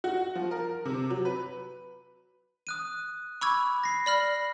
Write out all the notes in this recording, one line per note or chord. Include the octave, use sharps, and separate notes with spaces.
F#4
F3
A#4
C3
F#3
B4
D#6 F#6 D#7
B5 C#6 D6 E6 G#6
A#6 C7
D5 B5 F6